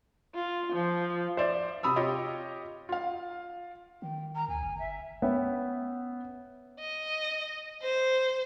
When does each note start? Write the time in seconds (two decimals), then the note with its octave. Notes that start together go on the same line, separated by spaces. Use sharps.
0.35 F4
0.73 F3
1.37 C5 D5 E5
1.83 C3 B5 D#6 E6
1.96 F4 G4 C#5 D#5
2.89 F4 F5
4.02 D#3 G5
4.35 A#5
4.48 D2 G#5
4.63 G1
4.79 E5
5.22 B3 C#4 E5 G5
6.80 D#5
7.82 C5